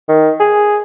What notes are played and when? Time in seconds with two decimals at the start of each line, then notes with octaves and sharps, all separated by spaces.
0.08 D#3
0.40 G#4